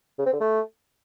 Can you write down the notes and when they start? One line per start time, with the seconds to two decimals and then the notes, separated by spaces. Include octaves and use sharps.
0.19 C#3
0.26 C4
0.33 D3
0.40 A3